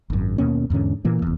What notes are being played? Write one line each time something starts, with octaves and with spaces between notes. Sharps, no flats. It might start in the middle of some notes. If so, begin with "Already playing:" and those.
G#1 F#2
D#2 B2 A#3 C#4
E2 G#2 D3 C#4
A#2 E3 A#3
F1 E2